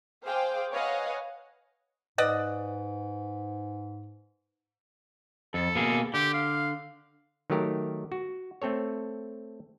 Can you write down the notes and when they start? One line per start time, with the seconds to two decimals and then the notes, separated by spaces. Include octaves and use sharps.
0.24 G#4 C5 F5 G5 D6
0.72 B4 C#5 D#5 F5 F#5 G#5
2.18 G#2 B4 D5 D#5 F#5
5.54 F2 A4
5.75 B2 A#3 G#4
6.14 D3 G4
6.34 F5
7.50 D#3 F#3 A3 G4 A#4
8.12 F#4
8.62 A3 C4 A4 C#5